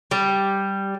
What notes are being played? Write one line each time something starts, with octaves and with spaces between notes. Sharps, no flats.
G3